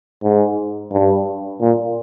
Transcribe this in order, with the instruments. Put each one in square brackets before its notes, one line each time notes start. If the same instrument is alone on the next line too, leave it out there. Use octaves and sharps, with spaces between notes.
[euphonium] G#2
G2
A#2